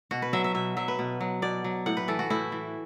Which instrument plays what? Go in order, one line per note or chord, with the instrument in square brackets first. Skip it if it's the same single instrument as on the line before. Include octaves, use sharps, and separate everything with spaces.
[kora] B2 F#4
B4
F#3 E5
E5
B2 E5
F#3 E5
B4
B2
F#3
B2 D5
F#3
A2 F#5
B4
E3 A4
F#4
A2 E4
E3